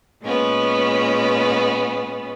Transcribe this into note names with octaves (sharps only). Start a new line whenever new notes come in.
A#2 G#3 B3 C#4